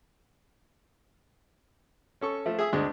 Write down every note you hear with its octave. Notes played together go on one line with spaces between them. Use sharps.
C#4 A4 C#6
F3 A3
G#4 E5 D#6
D2 G#3 D4